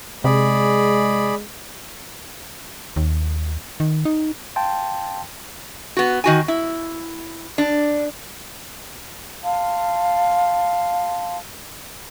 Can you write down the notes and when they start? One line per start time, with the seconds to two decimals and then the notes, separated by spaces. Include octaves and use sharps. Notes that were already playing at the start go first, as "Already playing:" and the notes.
0.24 C3 G#3 G#4 D5 B5
2.96 D#2
3.80 D#3
4.05 D#4
4.56 F5 G5 A5 C6
5.97 B3 F#4
6.24 D#3 F#4 G#5
6.48 E4
7.58 D4
9.43 F5 A5 C6